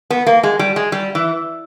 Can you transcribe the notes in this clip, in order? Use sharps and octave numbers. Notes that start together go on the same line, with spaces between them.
B3
A#3
G#3
G3
G#3
G3
E3